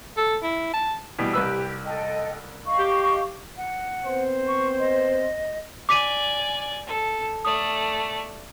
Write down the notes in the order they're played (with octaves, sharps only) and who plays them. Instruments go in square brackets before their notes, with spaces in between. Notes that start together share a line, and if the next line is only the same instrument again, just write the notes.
[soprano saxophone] A4
E4
A5
[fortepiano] B2 E3 G3
[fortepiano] C2 B4 E6 [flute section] G4
[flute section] A4 D#5 G5
D#5 F5 C#6
[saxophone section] G4
[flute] F#5
[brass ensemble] B3 C4 C5
[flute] C#6
D#5
[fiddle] D5 G#5 [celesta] D6 B6 D#7
[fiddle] A4
[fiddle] A3 D5 [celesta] D#6